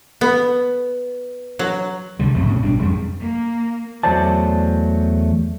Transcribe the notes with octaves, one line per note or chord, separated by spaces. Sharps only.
B3
F#3
C2 D3 G3
F2 C3 A3
G#2 B2 C#4
G#1 B2 G3 D4
F2 G3 G#3
A#3
E2 F#3 A3 C5 D5 A5